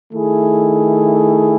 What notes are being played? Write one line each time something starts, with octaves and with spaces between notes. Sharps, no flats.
D#3 A3 E4 G#4